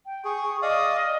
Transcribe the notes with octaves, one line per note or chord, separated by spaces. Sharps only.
G5
G#4 C#6
D5 D#5 F5 D#6